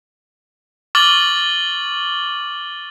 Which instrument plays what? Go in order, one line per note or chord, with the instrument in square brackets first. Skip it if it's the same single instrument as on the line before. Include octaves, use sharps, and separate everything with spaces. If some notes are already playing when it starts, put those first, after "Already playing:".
[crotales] C#6 D6 F6 A6 F#7 G7